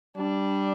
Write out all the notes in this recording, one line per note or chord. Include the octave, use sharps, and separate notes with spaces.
G3 D4